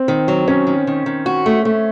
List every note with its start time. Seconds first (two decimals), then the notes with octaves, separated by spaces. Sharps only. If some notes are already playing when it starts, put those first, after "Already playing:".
Already playing: C4
0.08 D#3
0.28 F#3
0.48 D#3 C#4
0.67 D#3
0.87 D#3
1.06 D#3
1.26 F#4
1.46 A3
1.65 A3